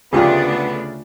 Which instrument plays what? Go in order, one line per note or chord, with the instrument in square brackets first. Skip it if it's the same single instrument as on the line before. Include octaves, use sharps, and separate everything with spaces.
[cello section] D2 A3 D4 [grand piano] C#3 [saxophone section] B3 [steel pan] F4 G4 G#4